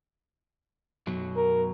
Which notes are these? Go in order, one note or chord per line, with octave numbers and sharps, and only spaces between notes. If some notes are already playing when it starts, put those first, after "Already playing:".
F#2 B2 F#3
A#4